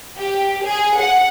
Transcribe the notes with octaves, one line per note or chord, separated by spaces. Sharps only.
G4
G#4
F#5